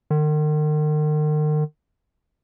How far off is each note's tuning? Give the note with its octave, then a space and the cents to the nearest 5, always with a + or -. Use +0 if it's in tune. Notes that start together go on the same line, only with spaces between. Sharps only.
D#3 -40